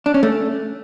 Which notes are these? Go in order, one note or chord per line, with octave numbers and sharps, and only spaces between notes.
D4
C#4
A3